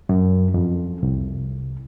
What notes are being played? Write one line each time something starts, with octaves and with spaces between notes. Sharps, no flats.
F#2
F2
C2